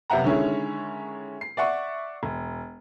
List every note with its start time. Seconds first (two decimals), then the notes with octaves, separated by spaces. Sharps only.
0.10 F#2 C3 B3 E5 F#5 A#5
0.24 D3 D#3 G#3 C#4 E4
1.41 C7
1.57 D5 E5 F#5 C#6
2.23 E1